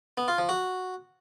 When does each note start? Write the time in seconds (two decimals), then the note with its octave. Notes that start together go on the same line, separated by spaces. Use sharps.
0.17 B3
0.28 F4
0.38 F3
0.49 F#4